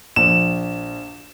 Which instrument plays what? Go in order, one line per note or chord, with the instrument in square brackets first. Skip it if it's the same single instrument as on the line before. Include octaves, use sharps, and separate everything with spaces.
[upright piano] A#1 [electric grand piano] E7